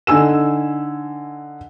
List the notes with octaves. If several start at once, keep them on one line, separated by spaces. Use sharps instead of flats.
D3 D#4 G#5 E6 E7